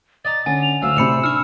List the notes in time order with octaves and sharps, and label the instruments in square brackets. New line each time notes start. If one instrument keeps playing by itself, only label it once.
[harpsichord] D5 D#5 A#5 [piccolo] A6
[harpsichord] D3 [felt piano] C#4 [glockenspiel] G#5
[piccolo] F7
[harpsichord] D2 F#3 F5 [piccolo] E6
[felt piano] A2 C3 [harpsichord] C5 D5 [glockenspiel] B5 C#7 E7
[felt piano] D4 [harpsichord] C#6 D#6 [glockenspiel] F6 C#7